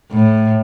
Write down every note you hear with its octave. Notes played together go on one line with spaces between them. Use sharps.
A2